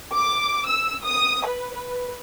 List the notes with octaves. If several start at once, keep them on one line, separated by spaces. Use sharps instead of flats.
D6
E6
D#6
B4
B4